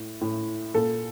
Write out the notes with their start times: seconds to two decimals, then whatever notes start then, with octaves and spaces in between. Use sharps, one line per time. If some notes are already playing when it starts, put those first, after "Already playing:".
Already playing: A2
0.21 A2
0.74 A#2 A4